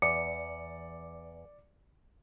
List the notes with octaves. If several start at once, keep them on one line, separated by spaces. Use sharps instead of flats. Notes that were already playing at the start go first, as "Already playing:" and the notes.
E2 D5 D6 C#7